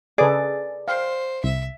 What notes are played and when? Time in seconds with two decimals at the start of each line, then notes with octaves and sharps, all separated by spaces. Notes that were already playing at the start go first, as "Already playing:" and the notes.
0.18 C#3 G#4 A4 B4 D5 D#5
0.88 C5 F5 G5
1.44 C2 E5